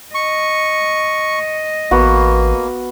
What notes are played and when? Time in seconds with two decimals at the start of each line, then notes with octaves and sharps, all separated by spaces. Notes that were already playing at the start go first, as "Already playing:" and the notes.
0.15 D#5 C#6
1.91 A1 A#3 B3 F#4